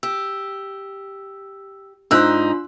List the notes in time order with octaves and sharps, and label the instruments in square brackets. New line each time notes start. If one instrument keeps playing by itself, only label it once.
[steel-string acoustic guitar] G4 [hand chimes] E6
[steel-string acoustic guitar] G#2 D#4 [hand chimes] D4 F4 C6 [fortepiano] E6 F#6